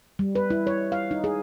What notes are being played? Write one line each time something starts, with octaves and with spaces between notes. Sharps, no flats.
G3
B4
E4
C#5
F5
D#4
G#4